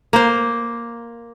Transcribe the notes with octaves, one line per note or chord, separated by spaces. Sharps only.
A#3 C5